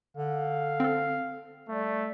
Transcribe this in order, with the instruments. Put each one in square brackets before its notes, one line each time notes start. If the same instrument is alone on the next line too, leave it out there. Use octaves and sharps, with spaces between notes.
[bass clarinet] D3 [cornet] F5
[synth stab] C4 A4
[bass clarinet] G3 [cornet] A3